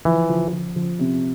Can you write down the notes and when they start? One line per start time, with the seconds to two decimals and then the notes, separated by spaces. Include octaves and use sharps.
0.05 E3 F3
0.29 F3
0.52 F3
0.76 F3
0.99 C3